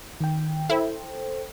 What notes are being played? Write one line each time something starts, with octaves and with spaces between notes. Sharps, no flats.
D#3 G5
E4 A4 C5 G5